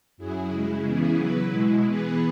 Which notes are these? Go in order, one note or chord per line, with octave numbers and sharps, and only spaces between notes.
F#2 F#3 E4 G#4
C#3 G#3 E4
C#3 E3 B3 E4 G#4
F#3 E4 B4
B2 G#3 E4
E3 B3 G#4 B4